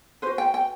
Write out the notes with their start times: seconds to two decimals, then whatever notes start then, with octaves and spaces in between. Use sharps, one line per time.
0.22 B4 C5
0.27 F#4
0.38 G5
0.54 G5